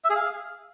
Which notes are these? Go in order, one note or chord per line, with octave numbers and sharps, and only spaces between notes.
E5
G#4
F5